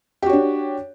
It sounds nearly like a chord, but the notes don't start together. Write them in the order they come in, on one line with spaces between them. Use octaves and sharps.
G4 F#4 C#5 D4